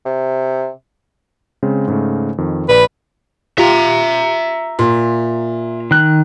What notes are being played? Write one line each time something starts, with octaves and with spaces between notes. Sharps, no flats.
C3
C#3 G#3 C4
G#2 C#3 A3
F2 D#3
A#1 B4 D5 B5
F4 G4 E5 A#5
A#2
D#3 F#6